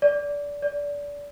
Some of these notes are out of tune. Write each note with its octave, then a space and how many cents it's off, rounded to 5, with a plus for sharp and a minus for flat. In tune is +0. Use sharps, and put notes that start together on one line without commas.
D5 -20
D5 -25